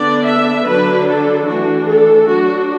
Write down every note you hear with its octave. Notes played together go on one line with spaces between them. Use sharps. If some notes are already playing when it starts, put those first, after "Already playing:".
Already playing: D3 B3 D4 D5
E5
D3 F#3 D4 B4
A4
E3 A3 D4 F#4
A4
F#3 D4 F#4